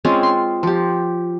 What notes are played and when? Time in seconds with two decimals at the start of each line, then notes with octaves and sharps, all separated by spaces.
0.05 G#3 C4 C#4 F4
0.23 C6
0.63 F3 G4